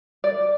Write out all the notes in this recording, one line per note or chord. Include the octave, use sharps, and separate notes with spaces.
D5